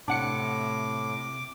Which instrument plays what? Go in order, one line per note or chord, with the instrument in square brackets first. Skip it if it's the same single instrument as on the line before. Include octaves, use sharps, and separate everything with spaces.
[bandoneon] A2 [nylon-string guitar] C3 [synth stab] D4 F#5 C#7 [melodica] D6